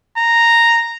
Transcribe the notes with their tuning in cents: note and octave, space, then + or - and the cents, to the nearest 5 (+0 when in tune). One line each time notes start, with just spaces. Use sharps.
A#5 -5